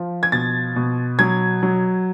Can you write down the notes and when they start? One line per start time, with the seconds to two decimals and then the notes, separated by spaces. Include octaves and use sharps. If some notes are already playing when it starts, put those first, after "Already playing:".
Already playing: F3
0.23 G#6
0.32 B2 A6
0.76 B2
1.19 F#3 G#6
1.63 F#3